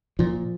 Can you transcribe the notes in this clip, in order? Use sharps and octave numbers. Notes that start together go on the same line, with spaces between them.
A#2 F3